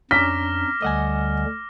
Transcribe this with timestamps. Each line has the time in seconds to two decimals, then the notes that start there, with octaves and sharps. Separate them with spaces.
0.11 F2 C#4 D4 A#5 D6 F6 A#6 B6
0.82 D2 D3 G3 D#5 F#5 G#5